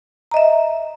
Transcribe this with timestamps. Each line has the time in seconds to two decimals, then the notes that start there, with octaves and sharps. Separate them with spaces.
0.31 A#5
0.34 D#5
0.37 E5